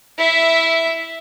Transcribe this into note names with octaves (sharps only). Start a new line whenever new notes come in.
E4 E5